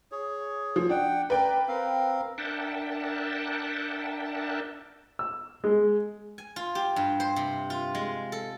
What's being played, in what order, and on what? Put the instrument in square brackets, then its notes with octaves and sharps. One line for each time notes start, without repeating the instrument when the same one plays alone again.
[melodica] G#4 C#5
[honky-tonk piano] F3
[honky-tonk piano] D4 [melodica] F#5 G5
[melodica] A#4 D5 [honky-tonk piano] B4 G5
[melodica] C4 A#4 F5
[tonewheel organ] D4 A#4 E5 F#5 G5 A5
[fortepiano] E6
G#3
[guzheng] G#5
F4
G4
G2
C5
C3
F4
G#3
A4